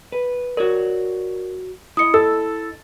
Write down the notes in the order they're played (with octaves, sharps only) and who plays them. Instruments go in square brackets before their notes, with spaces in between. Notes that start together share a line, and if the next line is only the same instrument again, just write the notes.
[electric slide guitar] B4
[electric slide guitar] F#4 C#5 D5 [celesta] A#4
[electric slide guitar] E4 D#5 [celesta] D#6 C#7
[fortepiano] A4 [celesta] E6